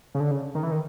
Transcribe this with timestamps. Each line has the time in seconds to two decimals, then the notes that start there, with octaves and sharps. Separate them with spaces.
0.15 C#3
0.20 D3
0.31 C#3
0.55 D#3
0.63 E3
0.71 D#3